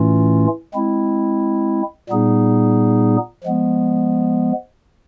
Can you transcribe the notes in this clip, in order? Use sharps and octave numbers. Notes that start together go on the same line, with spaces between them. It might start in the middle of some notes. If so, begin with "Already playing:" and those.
Already playing: A2 E3 A3 C#4 F4
G#3 C4 E4
A#2 G3 B3 D#4 G#4
F3 G#3 B3